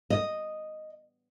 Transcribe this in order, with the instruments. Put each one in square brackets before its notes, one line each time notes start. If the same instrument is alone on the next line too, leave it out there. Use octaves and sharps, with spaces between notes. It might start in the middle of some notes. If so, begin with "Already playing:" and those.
[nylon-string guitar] D#5